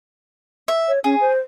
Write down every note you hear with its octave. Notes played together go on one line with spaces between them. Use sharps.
E5
C#5
C#4 G#4
C5